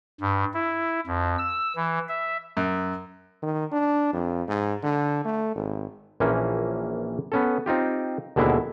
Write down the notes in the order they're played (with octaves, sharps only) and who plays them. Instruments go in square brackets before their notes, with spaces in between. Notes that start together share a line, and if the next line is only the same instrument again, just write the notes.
[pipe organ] G2
E4
F2
E6
E3
E5
[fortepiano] F#2
[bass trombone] D#3
D4
F2
G#2
D3
A3
G#1
[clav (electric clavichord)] A#1 E3 F3 A#3 C#4
B3 C#4 A4
C4 D#4 F4 G4
D#2 B2 D3 G#3 E4 E5